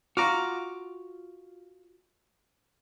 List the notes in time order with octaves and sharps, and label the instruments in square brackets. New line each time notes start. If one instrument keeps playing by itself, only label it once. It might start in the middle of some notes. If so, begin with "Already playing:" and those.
[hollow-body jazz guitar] F4 F#4 [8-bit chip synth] A#5 D6 F6